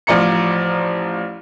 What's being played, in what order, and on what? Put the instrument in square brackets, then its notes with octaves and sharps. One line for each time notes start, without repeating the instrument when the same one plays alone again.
[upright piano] A1 F3 D5 A#5 C#7